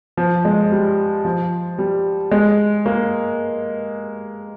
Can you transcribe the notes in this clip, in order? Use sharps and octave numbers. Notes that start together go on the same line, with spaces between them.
F3
G#3
G3
F3
G3
G#3
A#3